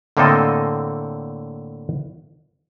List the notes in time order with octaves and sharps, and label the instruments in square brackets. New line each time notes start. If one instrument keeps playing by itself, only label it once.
[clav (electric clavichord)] A2 D3 A#3 C4 A4 D#5